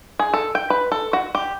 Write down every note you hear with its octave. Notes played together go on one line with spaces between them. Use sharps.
G#4
A4
G5
B4
A4
F#4
G4